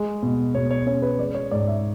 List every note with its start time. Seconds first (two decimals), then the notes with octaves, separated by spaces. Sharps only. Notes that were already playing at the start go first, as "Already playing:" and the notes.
Already playing: G#3
0.23 B2
0.55 B2 C#5
0.71 C#5
0.86 C#4 C#5
1.02 B4
1.19 G#3 D5
1.35 C#5
1.51 G#2 D5
1.68 E5